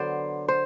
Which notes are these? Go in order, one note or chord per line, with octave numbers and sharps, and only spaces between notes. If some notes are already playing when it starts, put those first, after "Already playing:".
Already playing: D3 F#3 B3 C5 D5
C5